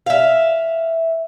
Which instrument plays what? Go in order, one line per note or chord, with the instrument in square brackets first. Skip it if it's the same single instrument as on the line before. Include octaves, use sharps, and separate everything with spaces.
[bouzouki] E5 F5